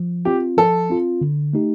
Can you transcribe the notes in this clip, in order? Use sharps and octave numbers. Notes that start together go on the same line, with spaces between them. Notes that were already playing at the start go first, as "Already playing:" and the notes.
Already playing: F3
C4 F4 G4
F3 A4
C4 F4
D3
A3 D#4 G4